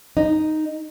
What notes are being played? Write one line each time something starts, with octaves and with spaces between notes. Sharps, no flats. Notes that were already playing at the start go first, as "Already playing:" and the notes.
D#4